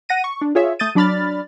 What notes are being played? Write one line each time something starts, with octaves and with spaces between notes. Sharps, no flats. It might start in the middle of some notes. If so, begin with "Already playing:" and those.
F#5 A#6 D#7
C#6
D4
F4 G#4 C#5 E5
A3 D#6 G6 A6 D#7
F#3 D4 D5 B5 F6 A6